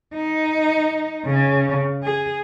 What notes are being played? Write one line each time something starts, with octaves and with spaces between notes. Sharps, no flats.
D#4
C#3
G#4